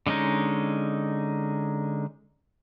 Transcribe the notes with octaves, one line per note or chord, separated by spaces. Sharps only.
D3 G#3 C#4 D#4